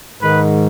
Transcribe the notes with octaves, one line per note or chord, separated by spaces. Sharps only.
G#2 D#3 B4